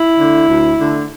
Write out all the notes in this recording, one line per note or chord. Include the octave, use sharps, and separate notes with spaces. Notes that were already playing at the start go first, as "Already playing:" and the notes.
Already playing: E4
D3 A3
D2
D3 A3